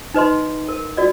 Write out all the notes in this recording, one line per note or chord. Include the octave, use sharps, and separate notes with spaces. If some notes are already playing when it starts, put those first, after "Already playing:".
D#4 B4 D#5 C6
A#4
F#4 D5 D#5